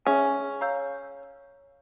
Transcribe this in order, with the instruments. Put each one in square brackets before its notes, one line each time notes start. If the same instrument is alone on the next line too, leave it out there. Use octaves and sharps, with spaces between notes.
[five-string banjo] C#4 [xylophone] G#4 E5 G#5
[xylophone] C#5 F5 A#5 E6 G6